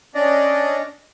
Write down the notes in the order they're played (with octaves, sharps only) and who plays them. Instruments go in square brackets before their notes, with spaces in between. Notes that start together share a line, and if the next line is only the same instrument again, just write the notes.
[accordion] C#4 D4 D5 D#5